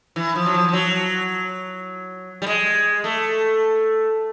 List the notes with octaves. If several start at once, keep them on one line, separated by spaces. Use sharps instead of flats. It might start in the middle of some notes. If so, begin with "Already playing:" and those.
E3
F3
F#3
F3
F3
F#3
G3
G#3
A3